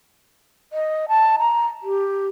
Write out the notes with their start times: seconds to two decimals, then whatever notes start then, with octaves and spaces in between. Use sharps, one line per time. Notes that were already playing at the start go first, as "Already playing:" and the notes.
0.73 D#5
1.08 A5
1.39 A#5
1.83 G4